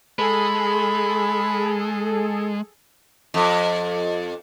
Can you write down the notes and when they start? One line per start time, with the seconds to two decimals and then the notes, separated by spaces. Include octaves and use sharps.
0.19 G#3 G#4 A4 B5
3.34 F2